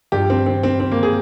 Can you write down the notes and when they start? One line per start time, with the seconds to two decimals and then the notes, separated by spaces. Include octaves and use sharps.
0.12 G2 F3 G4
0.30 C4
0.46 C4
0.63 C4
0.80 C4
0.92 A#3
1.03 G#4